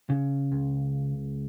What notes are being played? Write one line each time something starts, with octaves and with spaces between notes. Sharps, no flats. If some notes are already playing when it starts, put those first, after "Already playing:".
C#3
C#2